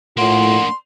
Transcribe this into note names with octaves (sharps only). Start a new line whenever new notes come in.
A2 A#3 D4 F4 F#5 C6